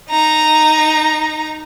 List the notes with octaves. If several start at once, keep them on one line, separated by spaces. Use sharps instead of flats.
D#4 A#5